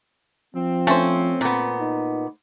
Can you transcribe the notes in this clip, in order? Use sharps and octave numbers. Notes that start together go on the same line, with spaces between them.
F3 C4
A3 C#4 C5
A#2 B3
D#4